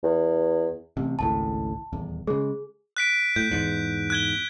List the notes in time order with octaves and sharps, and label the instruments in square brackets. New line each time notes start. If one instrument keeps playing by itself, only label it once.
[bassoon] E2
[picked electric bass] A1 C3
[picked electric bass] G#1 C#2 A2 [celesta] A5
[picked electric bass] D#1 E2
[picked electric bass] C#3 G#3 [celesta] G#4
[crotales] F#6 B6 D7
[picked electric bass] A2 [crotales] G6
[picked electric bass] E2 G#2
[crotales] F#6 G#6 G7